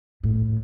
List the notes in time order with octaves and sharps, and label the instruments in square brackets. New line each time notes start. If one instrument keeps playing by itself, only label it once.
[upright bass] A2